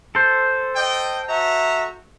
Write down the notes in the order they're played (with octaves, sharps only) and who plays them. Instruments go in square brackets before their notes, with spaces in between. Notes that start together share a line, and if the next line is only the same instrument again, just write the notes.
[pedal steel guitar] A4 C5
[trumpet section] D#5 G5
F#4 E5 A#5